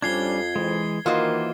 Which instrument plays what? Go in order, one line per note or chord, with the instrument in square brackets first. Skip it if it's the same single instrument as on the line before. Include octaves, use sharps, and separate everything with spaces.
[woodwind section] F2 [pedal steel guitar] G3 C#4 D4 [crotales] G#6 C7 G7
[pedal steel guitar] E3 G#3
[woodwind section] D#3 [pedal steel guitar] E3 A#3 C5 [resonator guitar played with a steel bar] F4 F#4 D#5